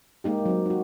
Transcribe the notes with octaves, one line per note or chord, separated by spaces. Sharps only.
G#3 A#3 D#4 G4
F#3 C4
D#4 F#4